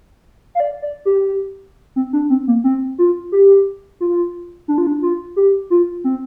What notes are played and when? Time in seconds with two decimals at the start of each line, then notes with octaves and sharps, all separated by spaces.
0.55 F5
0.60 D5
0.82 D5
1.05 G4
1.96 C4
2.13 D4
2.30 C4
2.48 A#3
2.64 C4
2.98 F4
3.32 G4
4.01 F4
4.68 D4
4.78 F4
4.87 D4
5.02 F4
5.36 G4
5.70 F4
6.04 C4